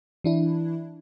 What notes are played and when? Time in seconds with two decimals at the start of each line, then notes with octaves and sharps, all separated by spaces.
0.24 E3 D4 E4